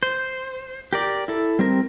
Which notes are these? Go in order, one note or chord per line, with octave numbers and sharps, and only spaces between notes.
C5
G4 A#4 D5
E4 A4
G3 C4 A#4